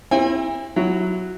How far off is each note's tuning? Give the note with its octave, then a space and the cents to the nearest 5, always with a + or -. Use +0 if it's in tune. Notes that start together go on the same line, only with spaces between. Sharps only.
C4 +35 E4 +0 G#5 -40
F#3 -5 E4 +0